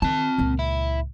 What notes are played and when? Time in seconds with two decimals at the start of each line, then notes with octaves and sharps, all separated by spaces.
0.02 D#3 C4 A5
0.38 C#2 A#2
0.59 E4